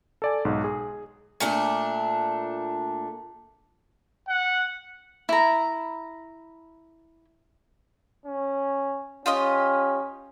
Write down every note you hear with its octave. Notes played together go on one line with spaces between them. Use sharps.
A4 D5 G#5
B1 G#2
G#4
A#2 A3 D4
F#5
E4 A#5
C#4
C#4 F4 G4 D#5